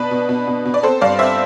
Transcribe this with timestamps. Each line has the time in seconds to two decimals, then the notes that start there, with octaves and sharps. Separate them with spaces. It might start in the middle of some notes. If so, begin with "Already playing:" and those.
Already playing: B2 D4 B4
0.11 B2
0.29 B2
0.47 B2
0.65 B2
0.74 D5
0.83 C4 A4 C5
1.01 G2 D5 F5
1.19 C4 C5 E5